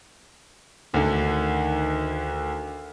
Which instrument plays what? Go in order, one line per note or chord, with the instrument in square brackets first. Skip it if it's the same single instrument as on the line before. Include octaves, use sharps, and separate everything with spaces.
[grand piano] D2 D3 [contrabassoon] D#3